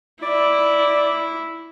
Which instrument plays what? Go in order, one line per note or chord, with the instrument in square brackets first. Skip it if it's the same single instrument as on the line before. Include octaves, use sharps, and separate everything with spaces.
[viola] E4 [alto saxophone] D5